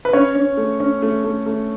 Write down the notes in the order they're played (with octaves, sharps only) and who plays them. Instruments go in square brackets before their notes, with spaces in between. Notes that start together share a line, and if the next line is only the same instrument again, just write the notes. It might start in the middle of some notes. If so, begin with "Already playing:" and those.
[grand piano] B4
C#4 C#5
C#4
A3
C#4
A3
A3
A3